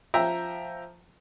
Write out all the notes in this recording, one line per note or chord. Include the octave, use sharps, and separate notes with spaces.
F3 E5 G5 A#5